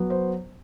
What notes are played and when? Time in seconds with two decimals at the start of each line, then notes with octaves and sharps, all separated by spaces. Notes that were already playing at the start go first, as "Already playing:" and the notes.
Already playing: F#3 B3
0.10 C5